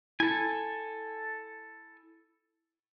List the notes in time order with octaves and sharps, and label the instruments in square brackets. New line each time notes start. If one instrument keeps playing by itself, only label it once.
[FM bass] E4 [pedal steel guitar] A4 G#5